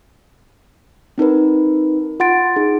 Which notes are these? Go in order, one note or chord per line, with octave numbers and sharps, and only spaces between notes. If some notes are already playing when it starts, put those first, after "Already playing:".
C4 D#4 A#4 B4
F4 F#5 C6 A6 D7
D#4 G#4